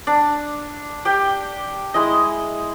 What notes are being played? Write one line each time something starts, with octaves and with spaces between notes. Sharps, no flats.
D4
G4 G5
G#3 E4 D#5